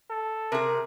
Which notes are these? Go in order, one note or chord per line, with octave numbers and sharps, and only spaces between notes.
A4
C3 G#4 A#4